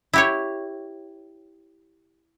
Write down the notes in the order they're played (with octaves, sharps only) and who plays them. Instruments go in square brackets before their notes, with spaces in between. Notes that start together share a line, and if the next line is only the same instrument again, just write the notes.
[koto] E4 G4 C#5